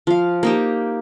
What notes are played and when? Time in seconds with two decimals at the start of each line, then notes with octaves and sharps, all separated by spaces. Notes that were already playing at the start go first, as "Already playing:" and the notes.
0.07 F3 F5
0.43 A#3 D#4 G4